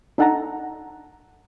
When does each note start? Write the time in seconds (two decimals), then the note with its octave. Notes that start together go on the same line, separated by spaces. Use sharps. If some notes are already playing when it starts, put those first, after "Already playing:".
0.18 D4 D#4 A4 F#5 A5 A#5